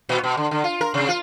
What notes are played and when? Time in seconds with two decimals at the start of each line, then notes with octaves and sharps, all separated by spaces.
0.09 A#2
0.24 B2
0.37 D3
0.51 D3
0.64 F4
0.81 A#4
0.94 C3
1.09 F4